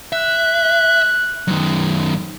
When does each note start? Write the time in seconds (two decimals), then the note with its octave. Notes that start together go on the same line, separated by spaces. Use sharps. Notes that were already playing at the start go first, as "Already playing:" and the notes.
0.12 E5 F#6
1.48 F#2 D#3